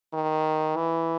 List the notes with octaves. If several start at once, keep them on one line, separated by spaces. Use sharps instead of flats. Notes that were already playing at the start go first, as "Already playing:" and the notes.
D#3
E3